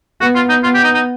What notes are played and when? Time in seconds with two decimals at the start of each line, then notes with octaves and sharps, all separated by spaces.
0.21 B3 F#4
0.35 F4
0.49 D#4
0.63 B3 F4
0.74 G4
0.84 D#4
0.94 D#4